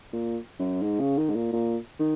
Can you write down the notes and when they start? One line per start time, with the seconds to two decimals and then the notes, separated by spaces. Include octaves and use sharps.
0.13 A#2
0.59 F#2
0.82 G#2
1.00 C#3
1.17 D#3
1.29 G#2
1.35 A#2
1.53 A#2
1.99 D#3